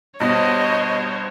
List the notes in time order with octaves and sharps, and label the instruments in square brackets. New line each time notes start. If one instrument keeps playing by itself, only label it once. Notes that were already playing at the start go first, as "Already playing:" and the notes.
[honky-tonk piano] G2 B2 [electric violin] C5 C#5 [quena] D#5